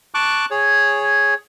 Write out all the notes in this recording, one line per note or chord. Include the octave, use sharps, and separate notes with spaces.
A5 C#6 D6 F#6
G#4 C#5